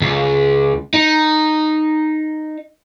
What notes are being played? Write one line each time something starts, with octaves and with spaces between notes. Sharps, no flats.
C#2
D#4